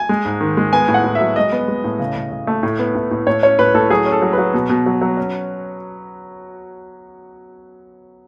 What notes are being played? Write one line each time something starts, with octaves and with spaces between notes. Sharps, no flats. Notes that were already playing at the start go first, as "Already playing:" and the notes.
Already playing: G#5
G#3
G#2
D#3
G#3
B3 G#5
A2
F#5
A2
E5
F#3
G#3 D#5
B3
G#3
A2
C#3
C#3
C#3
A3
A2
B3
A2
A2
A2 C#5
C#4 C#5
A2 B4
A2 A4
F#3 G#4
C#4
A4
F#3
B4
F#3
B2
B2
F#3
F#3
C#4